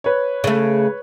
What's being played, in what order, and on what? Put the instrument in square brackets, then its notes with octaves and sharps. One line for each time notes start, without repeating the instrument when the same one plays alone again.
[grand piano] B4 C#5
[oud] C#3 A3